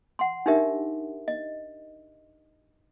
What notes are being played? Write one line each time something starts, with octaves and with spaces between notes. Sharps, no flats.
F#5 C6
D4 D#4 G4 A#4 E5
D#5